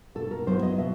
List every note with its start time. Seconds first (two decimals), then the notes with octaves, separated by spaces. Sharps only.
0.15 B2 A4
0.31 A#4
0.47 F#3 B3 E4 C5
0.62 D#5
0.78 B2 E5